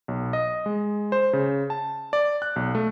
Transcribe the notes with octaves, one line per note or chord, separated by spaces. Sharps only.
B1
D#5
G#3
C5
C#3
A5
D5
F#6
B1
A3